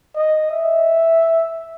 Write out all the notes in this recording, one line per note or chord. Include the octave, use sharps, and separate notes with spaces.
D#5
E5